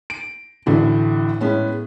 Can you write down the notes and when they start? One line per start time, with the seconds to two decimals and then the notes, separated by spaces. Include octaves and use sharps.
0.10 D7
0.66 A1 A2 D3 E3 F#4
1.41 A2 G#3 B3 C#4